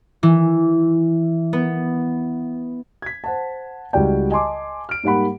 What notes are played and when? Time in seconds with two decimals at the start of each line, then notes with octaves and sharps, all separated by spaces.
0.23 E3
1.53 B3
3.02 G#6 B6
3.24 C5 F#5 A5
3.93 C#2 G3 E4 F#4 D5 G5
4.31 D#5 G#5 A5 C6 D6
4.89 F6 D7
5.03 G#2 G3 A#3 F#5 B5